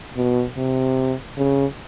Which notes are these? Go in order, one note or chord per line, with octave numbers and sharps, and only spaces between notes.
B2
C3
C#3